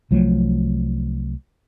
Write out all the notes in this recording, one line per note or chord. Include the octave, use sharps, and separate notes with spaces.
C2 F3 F#3 A3